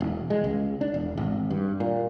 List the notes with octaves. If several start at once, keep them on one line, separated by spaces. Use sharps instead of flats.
E1
G#3
C#2
D4
E1
G#1
G2
A#2